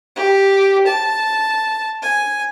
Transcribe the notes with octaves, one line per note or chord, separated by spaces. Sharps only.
G4
A5
G#5